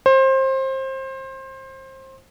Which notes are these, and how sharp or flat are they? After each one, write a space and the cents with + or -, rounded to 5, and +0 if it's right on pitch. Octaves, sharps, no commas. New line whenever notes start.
C5 +25